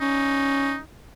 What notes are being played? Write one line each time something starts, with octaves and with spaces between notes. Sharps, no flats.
C#4 D#4